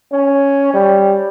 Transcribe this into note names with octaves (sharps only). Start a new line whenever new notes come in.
C#4
G3